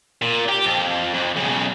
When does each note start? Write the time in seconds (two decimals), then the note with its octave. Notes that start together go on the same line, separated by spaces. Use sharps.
0.22 A#2
0.49 G4
0.65 F2
1.14 F2
1.36 B1 C#3